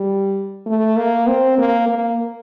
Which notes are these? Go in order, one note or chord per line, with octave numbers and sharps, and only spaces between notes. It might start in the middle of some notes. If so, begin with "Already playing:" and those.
Already playing: G3
A3
A#3
C4
A#3
A#3